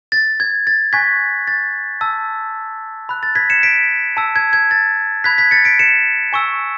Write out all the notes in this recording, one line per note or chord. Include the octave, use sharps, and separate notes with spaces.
A6
G#6
A6
G#5 C#6 F#6 G#6 B6
A6
A5 E6
B5 F#6
A6
G#6 B6
C#7 E7
B6 D7
A5 E6
G#6
G#6
A6
B5 F#6 G#6 B6
G#6 B6
A6 C#7
B6 D7
C#7 E7
G#5 C#6 E6